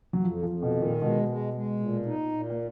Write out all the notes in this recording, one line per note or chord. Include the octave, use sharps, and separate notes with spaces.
F#3
F2 F3
F3
F2
B2
D#3
A#2
B2 G#3
G#3
G#3
A#2
D#4
A#2
A#3